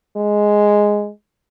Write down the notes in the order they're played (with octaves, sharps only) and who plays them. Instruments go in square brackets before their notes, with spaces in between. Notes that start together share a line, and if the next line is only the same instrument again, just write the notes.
[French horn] G#3